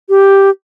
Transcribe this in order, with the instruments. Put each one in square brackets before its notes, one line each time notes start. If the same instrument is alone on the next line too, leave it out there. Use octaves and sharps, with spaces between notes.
[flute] G4